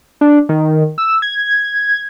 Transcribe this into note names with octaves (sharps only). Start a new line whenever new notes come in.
D4
D#3
E6
G#6